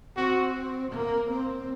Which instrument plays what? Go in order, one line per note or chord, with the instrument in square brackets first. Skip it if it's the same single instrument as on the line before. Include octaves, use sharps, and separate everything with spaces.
[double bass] C4 [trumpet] F#4
[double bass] A#3
C4